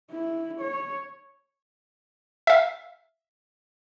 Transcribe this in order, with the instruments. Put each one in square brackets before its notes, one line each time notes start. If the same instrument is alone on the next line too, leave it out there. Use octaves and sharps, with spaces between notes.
[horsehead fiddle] E4
C#5
[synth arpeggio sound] E5 F5